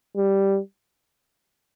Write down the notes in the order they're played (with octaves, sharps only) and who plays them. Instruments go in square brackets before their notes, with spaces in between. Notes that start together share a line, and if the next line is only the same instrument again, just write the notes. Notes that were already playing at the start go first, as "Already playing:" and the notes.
[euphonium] G3